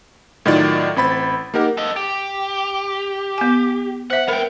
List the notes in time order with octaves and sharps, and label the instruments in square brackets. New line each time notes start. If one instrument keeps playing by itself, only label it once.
[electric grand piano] A2 D#3 F#3 F4 D5 A6
A1 C4 B5 A6
A#3 D#4 G4 A#4 F#5
[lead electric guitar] A4 D#5
G4
[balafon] B3 G#5
[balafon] C5 E5 [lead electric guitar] F#5
[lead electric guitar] B3 G5 [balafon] A#4